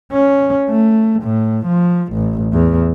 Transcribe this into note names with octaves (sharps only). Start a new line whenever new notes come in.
C#4
A3
A2
F3
A1
E2